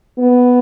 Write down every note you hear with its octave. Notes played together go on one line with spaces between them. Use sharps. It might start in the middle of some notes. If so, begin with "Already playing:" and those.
B3